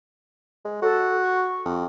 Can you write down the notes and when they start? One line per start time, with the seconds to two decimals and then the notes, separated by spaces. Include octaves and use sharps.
0.65 G#3
0.82 F#4 A4
1.22 C#6
1.65 F2